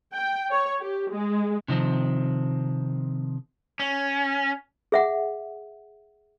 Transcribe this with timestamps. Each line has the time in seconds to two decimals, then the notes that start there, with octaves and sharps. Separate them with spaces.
0.13 G5
0.50 C#5
0.80 G4
1.11 G#3
1.68 C3 D#3 F3 C4
3.79 C#4
4.92 G#4 E5 F#5